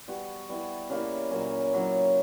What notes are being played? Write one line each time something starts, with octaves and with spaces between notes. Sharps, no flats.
G3 B3 F#4
G3 B3 E4
C#3 G3 A#3 E4
A#2 F#3 A#3 C#4
C#3 F#3 C#4 E4